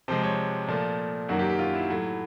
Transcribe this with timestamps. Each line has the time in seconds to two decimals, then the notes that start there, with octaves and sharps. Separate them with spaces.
0.08 C3 F3 G#3 C5
0.23 C#5
0.68 A#2 F3 A3
1.29 F#2 D#3 F#3 A#3 F#4
1.39 G4
1.49 G4
1.59 F4
1.74 E4
1.89 A2 F#3 A3